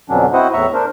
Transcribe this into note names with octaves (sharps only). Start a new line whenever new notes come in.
F2 B2 D3 F#3 C#4 D4
C4 E4 F#4 C5 D#5 F#5
E2 A2 E5 A#5 C#6
D4 A#4 C5